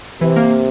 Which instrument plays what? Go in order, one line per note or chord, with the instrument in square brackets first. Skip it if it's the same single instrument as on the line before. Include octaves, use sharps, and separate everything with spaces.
[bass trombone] C3 [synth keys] E3
[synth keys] A#3